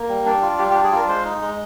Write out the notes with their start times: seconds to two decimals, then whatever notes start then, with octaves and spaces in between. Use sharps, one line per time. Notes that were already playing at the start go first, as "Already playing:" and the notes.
Already playing: A#3
0.09 G3
0.26 D4
0.42 F4
0.59 G3 G4
0.71 G4
0.75 D4
0.84 G#4
0.92 F4 A#4
1.08 G#3 C5
1.25 D#4
1.41 G#3